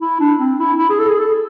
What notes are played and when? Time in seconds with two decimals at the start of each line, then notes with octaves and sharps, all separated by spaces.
0.02 E4
0.20 D4
0.40 C4
0.59 E4
0.79 E4
0.90 G#4
0.99 A4
1.09 G#4
1.19 A4